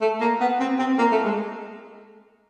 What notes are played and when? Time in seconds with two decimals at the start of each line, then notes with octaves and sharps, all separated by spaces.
0.01 A3
0.21 A#3
0.41 B3
0.60 C4
0.79 C4
0.98 A#3
1.11 A3
1.25 G#3